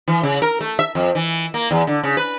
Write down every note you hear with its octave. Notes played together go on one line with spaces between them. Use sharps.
E3
C#3
A#4
A3
E5
F2
E3
A#3
E2
D3
C#3
B4